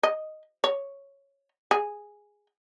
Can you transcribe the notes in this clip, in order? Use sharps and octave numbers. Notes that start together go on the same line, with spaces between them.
D#5
C#5
G#4